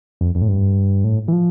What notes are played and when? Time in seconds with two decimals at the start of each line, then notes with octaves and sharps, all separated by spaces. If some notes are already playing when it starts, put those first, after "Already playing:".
0.21 F2
0.35 F2
0.42 A2
0.48 G2
1.04 A2
1.28 E3
1.33 F3